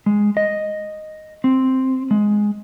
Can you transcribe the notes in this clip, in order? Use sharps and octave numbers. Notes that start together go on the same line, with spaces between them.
G#3
D#5
C4
G#3